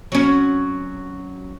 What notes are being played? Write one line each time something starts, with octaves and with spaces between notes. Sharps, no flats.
F#3 C#4